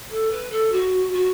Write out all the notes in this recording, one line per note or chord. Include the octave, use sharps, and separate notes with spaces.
A4
B4
A4
F#4
F#4